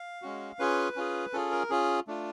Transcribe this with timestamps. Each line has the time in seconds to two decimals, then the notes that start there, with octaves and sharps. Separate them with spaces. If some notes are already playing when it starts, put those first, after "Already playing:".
Already playing: F5
0.22 G#3 C#4 F#4
0.59 C#4 F4 G#4 B4
0.96 C#4 F4 G#4
1.33 C#4 F4 G#4 A4
1.52 A#4
1.70 C#4 F4 G#4
2.07 A3 D4 F4